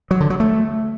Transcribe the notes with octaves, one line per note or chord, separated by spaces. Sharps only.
F#3
D3
F#3
A3